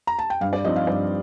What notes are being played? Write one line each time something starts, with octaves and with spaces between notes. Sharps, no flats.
A#5
A5
G5
G2 F5
D5
F3 C4 D#4 D#5
F5
G2 D5